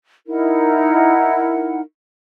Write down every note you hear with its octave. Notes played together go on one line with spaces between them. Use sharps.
D#4 E4 A#4 F#5